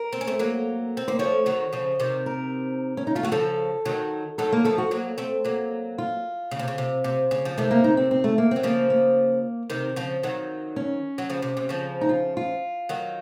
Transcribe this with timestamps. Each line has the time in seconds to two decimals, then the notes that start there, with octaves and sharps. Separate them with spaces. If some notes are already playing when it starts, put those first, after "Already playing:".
Already playing: A#4
0.13 C4
0.21 C#4
0.27 A3 C4
0.39 F#3 A#3
0.97 C4
1.08 A#3 C5
1.19 F3 A3 C#5
1.46 D#3 F#3
1.73 C#3 F3
2.00 C3 D#3
2.26 A#4
2.97 C#4
3.07 D#4
3.15 A3 F4
3.23 F#3 F#4
3.32 C#3 F3 A4
3.85 D#3 F#3
4.38 D#3 F#3 A4
4.52 A#3
4.65 F3 A3 A4
4.78 F#4
4.91 F#3 A#3
5.18 A3 C4
5.45 F#3 A#3
5.98 F4
6.51 C#3
6.59 C3
6.68 C#3
6.78 C3
7.04 C3
7.31 C#3
7.45 F3
7.58 C3 D#3 A3
7.71 A#3
7.84 D#4
7.97 C4
8.11 C4
8.24 A3
8.38 A#3
8.51 F#3 C4
8.63 C#3 F3 A#3
8.90 A#3
9.70 C3 D#3
9.96 C#3 F3
10.23 D#3 F#3
10.76 C#4
11.18 F#3
11.30 C#3 F3
11.42 C3
11.57 C3
11.69 C#3 F3
12.01 D#4
12.09 F4
12.37 F4
12.89 D#3 F#3